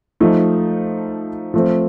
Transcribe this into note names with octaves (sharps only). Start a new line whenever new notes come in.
F3 A3 D#4
F3 A3 C4